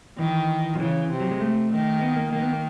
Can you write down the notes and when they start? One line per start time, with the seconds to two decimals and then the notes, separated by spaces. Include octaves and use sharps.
0.19 D#3 E3
0.76 F3
0.80 C#3 E3
1.10 C3
1.20 F#3
1.31 G#3
1.41 A3
1.71 D#3
2.01 B3
2.16 A#3
2.32 D#3 A#3
2.42 B3
2.53 A#3